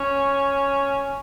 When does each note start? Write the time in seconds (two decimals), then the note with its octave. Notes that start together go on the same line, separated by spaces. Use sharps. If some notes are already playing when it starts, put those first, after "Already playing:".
Already playing: C#4